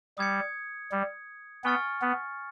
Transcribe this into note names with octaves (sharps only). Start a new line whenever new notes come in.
G3 D#6 G#6 C#7
G3
B3 G#5 C#6 F6 A6 C#7
B3